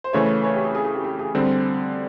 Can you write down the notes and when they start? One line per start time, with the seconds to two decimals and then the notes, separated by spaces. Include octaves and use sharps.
0.04 C5
0.13 C#3 E3 A3 B4 C#5
0.44 B4 C#5
0.54 G4
0.64 G#4
0.75 G#4
0.85 G#4
0.94 G4
1.04 G4
1.19 G#4
1.35 D3 G3 C4